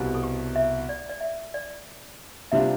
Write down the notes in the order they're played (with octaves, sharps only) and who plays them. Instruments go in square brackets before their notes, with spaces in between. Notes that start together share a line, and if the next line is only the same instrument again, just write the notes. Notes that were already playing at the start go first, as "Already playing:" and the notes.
Already playing: [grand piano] C2 B2 G3
[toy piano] A4
G4
E5
D5
D5
E5
D5
[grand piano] C3 G3 D4 F4 [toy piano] E5